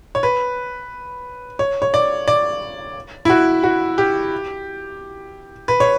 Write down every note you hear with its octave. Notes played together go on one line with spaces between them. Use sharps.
C#5
B4
C#5
C#5
D5
D5
E4
F#4
F#4
G4
B4
C#5